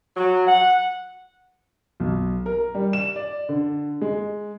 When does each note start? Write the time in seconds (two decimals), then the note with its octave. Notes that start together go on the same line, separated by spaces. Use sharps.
0.17 F#3
0.47 F#5
2.00 B1
2.46 A#4
2.74 G3
2.93 E7
3.16 D5
3.49 D3
4.01 G#3